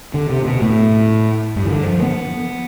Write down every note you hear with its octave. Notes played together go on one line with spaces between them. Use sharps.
D3
C3
B2
A2
G2
E3
D3
F3
B3